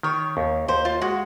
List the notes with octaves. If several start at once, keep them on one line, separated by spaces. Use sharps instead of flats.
D#3 C#5
D#2
D#2 C5
F4
G#3 F#4